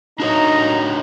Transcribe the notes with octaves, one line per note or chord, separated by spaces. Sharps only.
D4 D#4 F#4 C#5 A#5